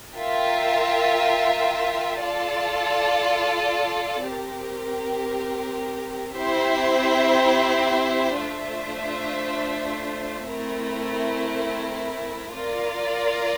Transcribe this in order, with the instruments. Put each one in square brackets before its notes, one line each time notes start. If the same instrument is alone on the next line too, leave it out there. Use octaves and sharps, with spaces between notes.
[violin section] F4 A#4 E5 G5
F4 A4 D5 A5
C4 G4 A#4
C4 E4 G4 C5 E5
A3 D4 F4 C5 E5
A3 C4 E4 A#4
F4 A#4 D5